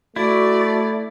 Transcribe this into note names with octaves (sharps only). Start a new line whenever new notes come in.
A3 E4 F#4 D5